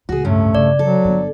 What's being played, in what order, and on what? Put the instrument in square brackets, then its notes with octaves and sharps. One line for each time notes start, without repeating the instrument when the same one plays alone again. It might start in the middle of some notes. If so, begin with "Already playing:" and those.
[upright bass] C#2 A2 [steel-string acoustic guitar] F#4 G#4
[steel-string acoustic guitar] G2 A#2 C#4 [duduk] A3
[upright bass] C#3 [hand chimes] D5
[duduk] F#3 [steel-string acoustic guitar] A4
[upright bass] G1 G2